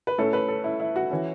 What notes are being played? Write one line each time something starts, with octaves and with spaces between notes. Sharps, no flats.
B4
A2 A3 C#4 A4
B4
A4
E4
E4
F#4
E3 C#4